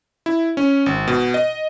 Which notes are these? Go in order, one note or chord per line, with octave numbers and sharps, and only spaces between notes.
E4
C#4
G#1
B2
D#5